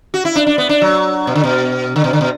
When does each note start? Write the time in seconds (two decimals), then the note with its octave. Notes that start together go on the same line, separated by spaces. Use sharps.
0.14 F#4
0.25 E4
0.36 D4
0.47 D4
0.58 B3
0.69 D4
0.82 F#3
1.27 B2
1.35 D3
1.44 B2
1.96 D3
2.04 B2
2.13 D3
2.21 B2